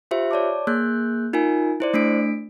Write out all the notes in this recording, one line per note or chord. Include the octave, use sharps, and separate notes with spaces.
F4 G4 C5 E5
C#5 D5 A5 D6
A#3 G#4 F#6 G6
D#4 F4 A#4 G#5
E4 C5 D5
A3 D4 B6 D7